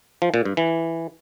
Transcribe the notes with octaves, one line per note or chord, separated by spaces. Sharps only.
F3
A#2
G2
E3